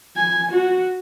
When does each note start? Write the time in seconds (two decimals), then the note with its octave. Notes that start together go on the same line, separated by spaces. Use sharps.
0.16 G#5
0.51 F#4